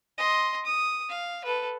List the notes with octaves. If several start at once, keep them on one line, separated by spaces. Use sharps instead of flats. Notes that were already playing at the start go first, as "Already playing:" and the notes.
D#5 C6
D#6
F5
A4 B4